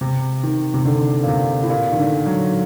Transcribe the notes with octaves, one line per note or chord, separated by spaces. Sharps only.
C3
D#3
C3
D3
A#2
C3
A2
A#2
D#3
D3
F#3